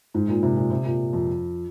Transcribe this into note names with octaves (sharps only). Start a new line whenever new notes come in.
G#2
A#2
C3
A#2
C3
A#2
F2